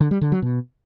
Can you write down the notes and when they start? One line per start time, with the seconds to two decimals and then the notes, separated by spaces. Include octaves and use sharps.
0.01 D3
0.11 G3
0.21 D3
0.32 F#3
0.42 B2